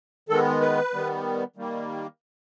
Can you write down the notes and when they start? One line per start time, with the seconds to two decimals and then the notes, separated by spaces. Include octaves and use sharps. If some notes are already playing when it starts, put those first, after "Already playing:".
0.29 D#3 G#3 B3 A4
0.61 B4
0.93 D#3 G3 B3
1.56 D#3 G3 A#3